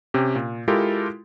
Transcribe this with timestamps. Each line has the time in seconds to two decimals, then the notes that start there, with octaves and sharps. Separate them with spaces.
0.14 C3 C#4 G4
0.35 A#2
0.68 G#3 E4 F4 G4 A4 A#4